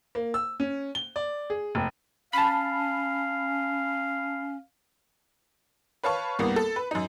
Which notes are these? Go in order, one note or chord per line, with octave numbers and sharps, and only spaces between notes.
A#3
E6
C#4
G7
D5
G#4
F1
C#4 F5 A5 B5
B4 C#5 F5 A5 C#6
C2 G2 A#3 B3
A4
B4
F#2 D#4